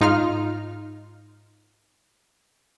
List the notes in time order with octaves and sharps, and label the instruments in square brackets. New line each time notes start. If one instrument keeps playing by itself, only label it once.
[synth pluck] G#2 D#4 F4 F6